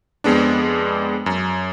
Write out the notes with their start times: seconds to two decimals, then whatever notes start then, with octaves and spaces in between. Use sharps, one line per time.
0.24 F2 G#3 B3 D4
1.26 F#2